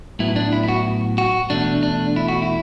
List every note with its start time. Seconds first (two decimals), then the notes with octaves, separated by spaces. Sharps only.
0.19 A2 F#3 B3 E4
0.36 D4
0.53 E4
0.63 E4
0.69 F#4
1.18 F#4
1.50 E2 B2 A3 D4
1.83 D4
2.16 E4
2.29 F#4
2.42 E4